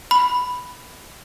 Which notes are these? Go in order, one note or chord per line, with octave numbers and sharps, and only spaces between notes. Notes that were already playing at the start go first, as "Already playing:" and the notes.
B5